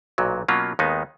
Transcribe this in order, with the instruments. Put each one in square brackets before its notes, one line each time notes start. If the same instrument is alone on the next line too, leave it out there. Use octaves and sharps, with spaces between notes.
[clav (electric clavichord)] B1 A#2 F#3
B2 F#3 A#3 C#4 F4
D#2 D#3 G#3 B3 D#4